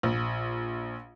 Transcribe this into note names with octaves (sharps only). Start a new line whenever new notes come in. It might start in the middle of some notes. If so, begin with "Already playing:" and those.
A#1